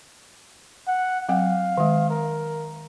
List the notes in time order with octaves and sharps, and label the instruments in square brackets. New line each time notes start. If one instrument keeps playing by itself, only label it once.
[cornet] F#5
[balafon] F#3 C4 F#5 [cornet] F5
[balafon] D#3 G#3
[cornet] A#4